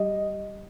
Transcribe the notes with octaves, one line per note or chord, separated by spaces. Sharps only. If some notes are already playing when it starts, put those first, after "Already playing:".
Already playing: G3 D#5